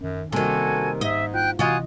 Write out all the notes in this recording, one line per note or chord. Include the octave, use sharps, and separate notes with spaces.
F#2 D#3 C#4
C3 D#3 G3 A#3 F#4 A4 G#5
G#2 D#5 E5
E4 F4 G5 F#6 G6
C3 E3 F4 F#4 D#5 G#5 D#6 F#6